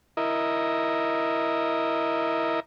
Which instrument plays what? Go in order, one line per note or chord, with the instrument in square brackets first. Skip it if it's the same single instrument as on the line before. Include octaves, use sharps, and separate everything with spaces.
[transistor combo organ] E4 A#4 D#5